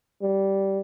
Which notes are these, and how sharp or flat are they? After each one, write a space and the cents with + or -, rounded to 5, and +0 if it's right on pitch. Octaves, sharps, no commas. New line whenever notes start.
G3 -10